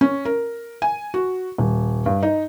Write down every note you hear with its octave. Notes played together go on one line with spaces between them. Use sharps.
C#4
A#4
G#5
F#4
D#1
G2
D#4